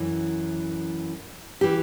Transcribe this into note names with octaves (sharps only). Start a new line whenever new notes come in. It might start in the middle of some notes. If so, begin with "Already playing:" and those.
Already playing: F#2 E3
E3 G4